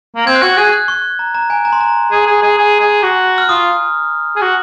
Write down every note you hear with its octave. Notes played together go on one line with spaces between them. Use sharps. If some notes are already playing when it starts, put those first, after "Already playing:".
A#3
C4 G#6
F#6
F#4 G#6
G#4 F#6
F#6
C#6
A#5
A#5
G#5
A#5
C6
A#5
G#4
G#4
G#4
G#4
G#4
F#4
F6
F4 D#6
G#4
F#4